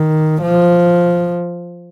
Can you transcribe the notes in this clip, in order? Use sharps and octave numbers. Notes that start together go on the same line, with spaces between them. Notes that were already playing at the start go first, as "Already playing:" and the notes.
Already playing: D#3
F3